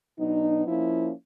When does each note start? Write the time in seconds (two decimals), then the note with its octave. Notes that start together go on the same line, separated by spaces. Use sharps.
0.19 B2 F#3 B3 D4 D#4
0.67 F3 A#3 C#4 E4